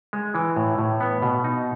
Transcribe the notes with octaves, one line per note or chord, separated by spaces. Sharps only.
G#3
E3
A2
A2
B3
B2
D#4